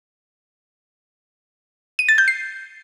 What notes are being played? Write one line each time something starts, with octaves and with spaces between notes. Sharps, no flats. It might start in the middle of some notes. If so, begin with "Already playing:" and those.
D#7
A6
G6
C7